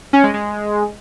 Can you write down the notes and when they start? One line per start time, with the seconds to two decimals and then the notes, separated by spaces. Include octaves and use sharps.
0.13 C#4
0.24 G#3
0.34 G#3